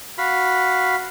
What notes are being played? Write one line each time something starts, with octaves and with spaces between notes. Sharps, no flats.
F#4 F5 B5